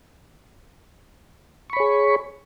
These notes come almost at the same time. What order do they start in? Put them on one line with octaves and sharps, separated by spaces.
C#6 B5 C#5 G#4